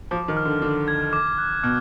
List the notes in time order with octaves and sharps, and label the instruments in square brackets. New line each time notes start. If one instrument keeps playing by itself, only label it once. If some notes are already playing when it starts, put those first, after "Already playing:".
[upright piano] F3 [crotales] D6
[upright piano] D#3
[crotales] F6
[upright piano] D3
[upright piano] D3 [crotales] D6
[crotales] G#6
D6
F#6
[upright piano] B2 [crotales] F6